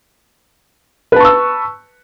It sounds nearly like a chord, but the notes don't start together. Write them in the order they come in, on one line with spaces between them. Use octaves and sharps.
B4 A5 C#6 E6